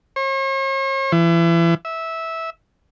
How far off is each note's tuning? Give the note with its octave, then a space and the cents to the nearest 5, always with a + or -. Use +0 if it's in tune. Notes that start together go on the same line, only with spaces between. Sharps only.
C#5 -45
E3 +30
E5 -15